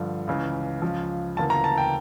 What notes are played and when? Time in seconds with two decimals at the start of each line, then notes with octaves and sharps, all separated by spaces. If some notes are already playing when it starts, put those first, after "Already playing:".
Already playing: G2 D3 F3
0.27 C#2 C#3 E3
0.82 C#2 C#3 F3
1.37 D2 C#3 E3 A#3 A5
1.50 A#5
1.64 A5
1.78 G5